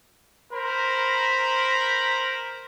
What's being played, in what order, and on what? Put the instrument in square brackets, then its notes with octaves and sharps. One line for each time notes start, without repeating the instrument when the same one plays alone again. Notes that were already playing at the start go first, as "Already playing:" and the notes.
[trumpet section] A#4 C5 A#5 B5